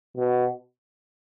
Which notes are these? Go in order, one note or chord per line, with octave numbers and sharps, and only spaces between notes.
B2